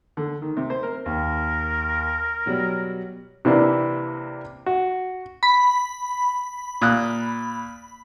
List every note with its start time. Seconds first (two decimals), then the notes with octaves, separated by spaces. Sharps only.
0.17 D3
0.42 D#3
0.57 C3
0.70 C5
0.83 A#4
1.06 D#2 A#4
2.46 B2 F#3 G3
3.45 C3 E3 A#3 D4
4.66 F#4
5.43 B5
6.82 A#2 D#6 F#6